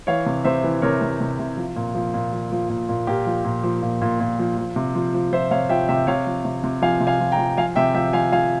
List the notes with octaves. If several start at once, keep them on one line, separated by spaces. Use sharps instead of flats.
E3 C#5 F5
C3
C3 C5 E5
E3
C3 A#4 C#5
C3
C3
C3
F3
A#2
F3
A#2
F3
F3
A#2
A#2
A#2 G4 A#4
F3
A#2
F3
A#2
A#2
A#2
F3
F3
C3
F3
F3
F3 C5 E5
C3 C#5 F5
F3 E5 G5
C3 E5 G5
C3 C#5 F5
F3
C3
C3
F3 F5 G#5
C3
F5 G#5
F3
G5 A#5
F3
F3 F5 G#5
C3 E5 G5
F3 E5 G5
F3 F5 G#5
F3 F5 G#5